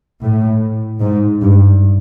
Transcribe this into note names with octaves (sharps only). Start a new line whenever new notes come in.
A2
G#2
G2